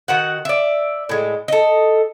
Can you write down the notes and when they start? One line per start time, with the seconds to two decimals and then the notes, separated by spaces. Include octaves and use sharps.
0.08 D#3 F#4 F#5
0.45 D5 E5
1.09 A2 G#3
1.48 A4 D#5